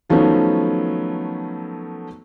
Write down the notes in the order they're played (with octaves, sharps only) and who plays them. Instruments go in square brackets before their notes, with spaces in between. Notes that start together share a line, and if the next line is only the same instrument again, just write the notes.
[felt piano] D#3 F3 F#3 A3 B3 C#4